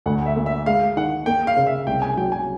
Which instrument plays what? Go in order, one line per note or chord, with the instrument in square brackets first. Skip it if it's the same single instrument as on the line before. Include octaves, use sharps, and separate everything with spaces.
[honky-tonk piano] D2 [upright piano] F#5
[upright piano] E5
[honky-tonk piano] A#3
[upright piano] E5
[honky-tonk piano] G#3 [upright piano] F5
[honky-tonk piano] D#3 [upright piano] F#5
[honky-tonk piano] A#3 [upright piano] G5
[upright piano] F5
[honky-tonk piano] C#3
[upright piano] E5
[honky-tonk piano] C2 [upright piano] G5
[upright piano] G#5
[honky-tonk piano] F#3 [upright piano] G5
[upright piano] G#5